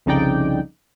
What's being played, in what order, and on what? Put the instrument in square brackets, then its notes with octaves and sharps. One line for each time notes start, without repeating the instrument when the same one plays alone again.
[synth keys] C2 F2 C#3 D#4 D5 G5